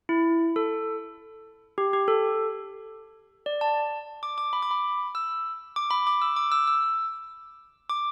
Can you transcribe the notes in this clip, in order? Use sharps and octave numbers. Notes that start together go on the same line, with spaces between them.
E4
A4
G4
G4
A4
D5
A5
D6
D6
B5
D6
B5
E6
D6
B5
D6
E6
D6
E6
E6
D6